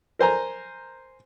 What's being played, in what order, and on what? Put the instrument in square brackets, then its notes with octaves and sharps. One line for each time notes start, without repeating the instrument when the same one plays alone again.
[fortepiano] A#4 C5 G#5 A#5